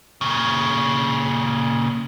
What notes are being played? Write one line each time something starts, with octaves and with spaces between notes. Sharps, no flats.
A#2 C#3